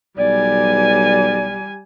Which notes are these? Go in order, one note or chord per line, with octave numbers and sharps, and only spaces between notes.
B1 G3 D5 G#5